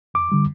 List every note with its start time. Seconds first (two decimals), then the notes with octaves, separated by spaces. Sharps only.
0.14 F2 D6
0.32 D3 G3